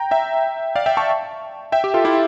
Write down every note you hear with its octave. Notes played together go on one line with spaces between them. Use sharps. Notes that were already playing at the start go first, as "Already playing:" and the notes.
Already playing: G5 A#5
E5 G5
D5 F5
E5 G5
A5 C#6
E5 G5
G4
F4 A4
E4 G4